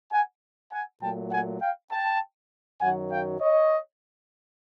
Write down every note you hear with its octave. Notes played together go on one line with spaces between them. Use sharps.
F#5 G#5
F#5 G#5
A#2 F#3 A3 G5 A5
F#5 G#5
F5 G5
G5 A5
F#2 D#3 F#3 F#5 G#5
F5 G5
C#5 D#5